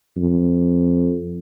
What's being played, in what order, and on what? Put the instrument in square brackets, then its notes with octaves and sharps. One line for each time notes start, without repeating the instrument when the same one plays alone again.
[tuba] F2